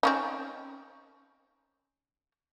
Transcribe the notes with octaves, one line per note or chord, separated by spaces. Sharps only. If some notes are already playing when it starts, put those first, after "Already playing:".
C4 C#4 D#4